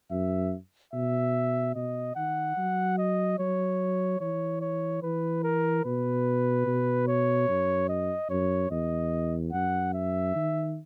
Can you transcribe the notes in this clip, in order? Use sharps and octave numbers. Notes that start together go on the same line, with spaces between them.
F#2 E5
B2 E5
B2 D#5
D#3 F#5
F#3
D#5
F#3 C#5
E3 C#5
C#5
E3 B4
A#4
B2 B4
B2
C#5
F#2
D#5
F#2 C#5
E2 D#5
F#2 F#5
E5
D#3